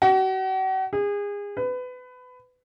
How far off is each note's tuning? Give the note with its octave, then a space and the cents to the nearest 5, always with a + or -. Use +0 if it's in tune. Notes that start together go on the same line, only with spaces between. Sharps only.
F#4 +40
G#4 -30
B4 +25